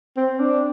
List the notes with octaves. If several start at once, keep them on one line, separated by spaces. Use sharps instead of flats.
C4
D4